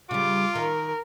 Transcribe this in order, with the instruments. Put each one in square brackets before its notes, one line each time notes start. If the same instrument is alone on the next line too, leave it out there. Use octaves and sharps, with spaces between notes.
[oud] C#3 G3 [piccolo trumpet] F4 [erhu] D6
[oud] D#3 [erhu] A#4